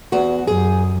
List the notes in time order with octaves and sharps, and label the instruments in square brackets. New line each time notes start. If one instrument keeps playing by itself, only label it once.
[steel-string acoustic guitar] E2 F#4
[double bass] F#2 [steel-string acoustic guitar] G#4